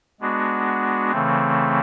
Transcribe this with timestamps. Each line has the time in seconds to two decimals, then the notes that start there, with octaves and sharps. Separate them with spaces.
0.21 G#3 B3 D4 F#4
1.11 C#3 E3 A3 C4